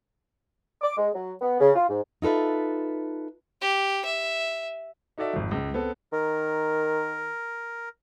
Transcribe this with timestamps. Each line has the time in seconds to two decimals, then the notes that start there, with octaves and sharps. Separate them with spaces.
0.81 D6
0.97 G#3
1.14 F#3
1.41 B3
1.60 C#3
1.75 F4
1.88 G#2
2.22 D#4 F4 A4 B4 E5
3.61 G4
4.05 E5
5.18 D#4 F#4 A4 D5 E5
5.33 G#1 F2
5.51 C#2
5.74 B3 C4 A4
6.13 D#3 A#4